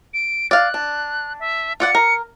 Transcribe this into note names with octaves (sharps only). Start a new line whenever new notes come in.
D7
D5 F5 F#6
D4
E5
F4 D5 F#5 C#7
A#4